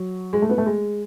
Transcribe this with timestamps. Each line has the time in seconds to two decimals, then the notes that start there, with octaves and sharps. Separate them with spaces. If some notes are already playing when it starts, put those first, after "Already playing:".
Already playing: F#3
0.33 G#3
0.42 A3
0.49 B3
0.58 A3
0.66 G#3